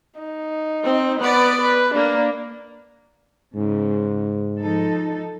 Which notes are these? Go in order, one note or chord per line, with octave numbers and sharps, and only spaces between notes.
D#4
C4
B3 B4 D5
B4
A#3 D4
G#2 C#3
F3 D#4 A4